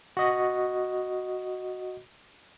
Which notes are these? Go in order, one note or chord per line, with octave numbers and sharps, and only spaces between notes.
F#4 D#5